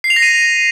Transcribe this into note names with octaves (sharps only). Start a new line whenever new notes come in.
C7
F7
A#6
D#7